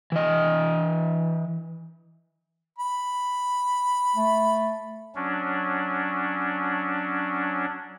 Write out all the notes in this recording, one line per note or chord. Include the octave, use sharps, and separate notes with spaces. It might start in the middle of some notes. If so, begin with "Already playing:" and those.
E3 D#5
B5
A3
F#3 C#4 D4